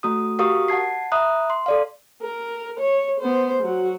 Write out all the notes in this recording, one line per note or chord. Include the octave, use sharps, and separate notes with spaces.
A3 F#4 D#6
F#4 G4 A#4 F5 C#6 D#6
F#5 A5 G#6 C7
E5 A#5 B5 D#6 F#6
C6
A4 D5 F5
A#4
C#5
B3 C5
F#3 F#4